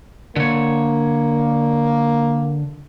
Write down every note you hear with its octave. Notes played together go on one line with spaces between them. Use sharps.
D3 A#3 C#5